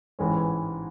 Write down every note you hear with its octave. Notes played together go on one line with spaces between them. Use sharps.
A1 G#2 E3 G#3 C#4